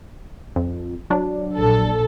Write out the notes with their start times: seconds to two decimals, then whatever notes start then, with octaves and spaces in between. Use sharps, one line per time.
0.56 F2
1.10 F#3 D4
1.56 A#1 A4